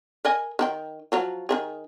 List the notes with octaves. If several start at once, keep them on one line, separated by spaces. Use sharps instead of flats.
A#4 D#5 G#5
D#3 E4 G5
F3 F#3 F5
D#3 E3 G#4